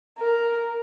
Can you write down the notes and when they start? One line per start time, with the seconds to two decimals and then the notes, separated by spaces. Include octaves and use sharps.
0.19 A#4